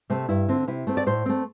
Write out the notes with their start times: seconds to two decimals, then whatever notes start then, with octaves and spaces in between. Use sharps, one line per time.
0.10 C3 A3 C4
0.29 G2 E4
0.48 D3 C4
0.68 C3 E4
0.87 A3 C4
0.97 D5
1.06 A2 C5
1.26 A3 C4